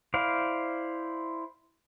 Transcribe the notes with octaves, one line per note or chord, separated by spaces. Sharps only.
E4 C5 D5 F5